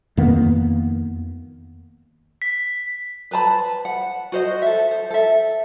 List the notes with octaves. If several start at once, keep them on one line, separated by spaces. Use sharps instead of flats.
F2 D#3 A#3 B3
B6
B4 C5 A5 B5
F#5
F#4 C5 D#5
A4 E5
C5
A4 E5